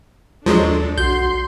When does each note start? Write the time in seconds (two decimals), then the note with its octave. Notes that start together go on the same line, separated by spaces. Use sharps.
0.46 D#2 F3 F#3 G#3 D4 A4
0.98 B1 F#4 C6 G6